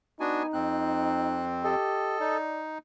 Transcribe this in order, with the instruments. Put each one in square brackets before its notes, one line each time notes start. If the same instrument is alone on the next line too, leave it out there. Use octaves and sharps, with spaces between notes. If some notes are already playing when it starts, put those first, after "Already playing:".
[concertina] B3 G#5 [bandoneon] D4 F#4 [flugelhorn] D#4
[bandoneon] F2 C4 [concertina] F#6
[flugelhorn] G4 [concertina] A4 D#5
[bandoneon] D#4 [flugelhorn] D5